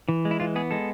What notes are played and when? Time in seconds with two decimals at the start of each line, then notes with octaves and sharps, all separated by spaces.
0.09 E3
0.25 G#3
0.31 E4
0.40 E3 F4
0.56 B3 G#4
0.71 G#3 A4